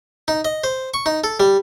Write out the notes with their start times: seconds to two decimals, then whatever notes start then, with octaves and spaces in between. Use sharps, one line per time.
0.28 D#4
0.45 D#5
0.64 C5
0.94 C#6
1.06 D#4
1.24 A4
1.40 G3